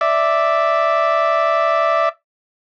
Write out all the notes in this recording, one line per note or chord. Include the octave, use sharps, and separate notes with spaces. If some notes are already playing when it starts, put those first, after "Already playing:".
D5 E5